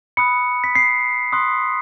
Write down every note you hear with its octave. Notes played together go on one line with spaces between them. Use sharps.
B5 D#6 F#6 C#7
B6
C7
C6 D#6 F#6